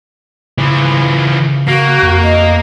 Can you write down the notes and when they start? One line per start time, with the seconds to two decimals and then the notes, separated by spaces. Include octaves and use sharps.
0.58 C#3 E3 F3
1.68 A#3 F#4
2.03 F2
2.23 D#5